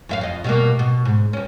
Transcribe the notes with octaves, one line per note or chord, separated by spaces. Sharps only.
F#2 E5 F5
F2 D#5
B2 G3 A#3
B2
G#2
G2 C#4